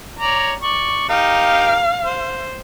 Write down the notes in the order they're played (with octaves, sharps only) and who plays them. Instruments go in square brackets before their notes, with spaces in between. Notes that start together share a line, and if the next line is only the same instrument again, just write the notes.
[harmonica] C#5 D5 A#5
D5 C#6
[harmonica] D#4 G4 A#4 [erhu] F5
[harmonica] C5